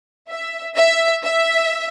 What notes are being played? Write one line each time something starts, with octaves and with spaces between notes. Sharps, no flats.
E5
E5
E5